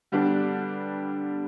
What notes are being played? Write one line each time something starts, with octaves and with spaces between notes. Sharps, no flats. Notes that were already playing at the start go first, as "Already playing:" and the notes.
D3 G3 B3 D4